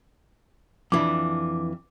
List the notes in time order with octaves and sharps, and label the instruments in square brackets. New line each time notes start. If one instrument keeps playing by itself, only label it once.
[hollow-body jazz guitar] F2 E3 D4 [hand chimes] D6